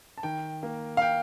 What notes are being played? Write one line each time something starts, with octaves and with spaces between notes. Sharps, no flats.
A5
D#3 G5
A#3
F5
G5